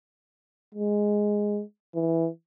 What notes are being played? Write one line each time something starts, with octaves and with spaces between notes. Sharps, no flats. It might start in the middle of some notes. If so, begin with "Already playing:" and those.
G#3
E3